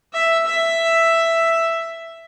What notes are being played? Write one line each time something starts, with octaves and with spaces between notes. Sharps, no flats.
E5
E5